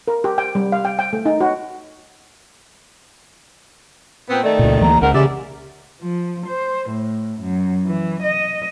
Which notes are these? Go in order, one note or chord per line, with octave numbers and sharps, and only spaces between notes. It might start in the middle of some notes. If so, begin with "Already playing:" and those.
A#4
G4
G5
G3
F5
G5
G5
A3
D#4
F#4
A#2 B3 C4
D#3 A3 D5
C#2 A#2
D2 E3 A#3 A#5
C#2 G#2 A#4 F#5
C#3 G#3 G4 D5 E5
F3
C5
A2
F#2
E3
D#5